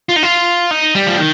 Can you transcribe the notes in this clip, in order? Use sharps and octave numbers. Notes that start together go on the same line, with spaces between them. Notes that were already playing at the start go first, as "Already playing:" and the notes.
F4
D#4
F4
D#4
G3
F3
D#3